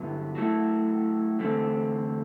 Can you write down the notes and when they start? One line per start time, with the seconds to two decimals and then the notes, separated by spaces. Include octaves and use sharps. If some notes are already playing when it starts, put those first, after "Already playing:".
Already playing: G2 D3 F#3 B3 E4
0.35 F#3 A3 E4
1.39 E2 D3 A3 C4